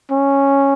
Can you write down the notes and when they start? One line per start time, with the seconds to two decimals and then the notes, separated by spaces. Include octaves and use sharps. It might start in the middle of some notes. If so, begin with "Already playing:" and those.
0.11 C#4